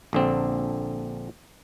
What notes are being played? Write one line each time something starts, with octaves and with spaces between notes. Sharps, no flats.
A#1 D3 C4